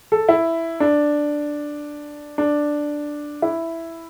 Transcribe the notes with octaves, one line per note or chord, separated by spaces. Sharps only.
A4
E4
D4
D4
E4